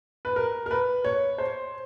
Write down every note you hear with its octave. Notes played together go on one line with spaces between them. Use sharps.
B4
A#4
A#4
B4
C#5
C5